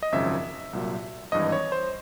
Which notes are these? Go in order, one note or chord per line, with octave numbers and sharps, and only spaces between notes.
D#5
G#1 F#2 C#3 F3 E5
C2 A#2 F#3
G#1 G2 E3 D#5
C#5
C5